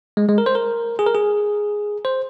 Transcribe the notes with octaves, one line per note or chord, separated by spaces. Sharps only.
G#3
G#3
A#4
C5
A#4
G#4
A#4
G#4
C5